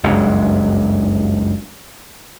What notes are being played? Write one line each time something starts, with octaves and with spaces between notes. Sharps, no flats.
F#1 C#2 G2